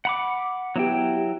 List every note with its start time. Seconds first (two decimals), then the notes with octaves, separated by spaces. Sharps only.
0.05 F#5 B5 D6
0.76 F#3 B3 E4 G4 G5